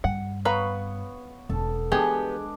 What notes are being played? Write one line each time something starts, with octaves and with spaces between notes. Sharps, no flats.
G2 F#5
B3 B4 C#5 F5 A#5
E1 C#4 A4 A5
E3 G#3 B3 D4 G4 G#4